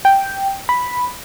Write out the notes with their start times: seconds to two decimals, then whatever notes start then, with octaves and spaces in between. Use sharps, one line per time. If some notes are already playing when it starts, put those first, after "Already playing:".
0.05 G5
0.69 B5